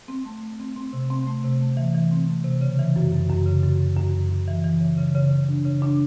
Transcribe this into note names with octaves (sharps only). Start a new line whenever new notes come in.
C4
A3
A3
C4
C4
C3
C4
A3
C3
A3
E3
E3
C4
A3
C3
C#3
E3
F#2
F#2
F#2
C#3
F#2
C#3
F#2
F#2
F#2
E3
E3
C#3
C#3
C#3
C#3
D4
C#3
D4